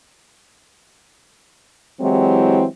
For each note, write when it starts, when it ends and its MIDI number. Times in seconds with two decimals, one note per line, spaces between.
2.00 2.65 52
2.00 2.65 54
2.00 2.65 56
2.00 2.65 60
2.00 2.65 64
2.00 2.65 67